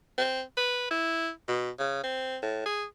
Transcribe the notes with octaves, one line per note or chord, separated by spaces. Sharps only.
C4
B4
E4
B2
C#3
C4
A2
G#4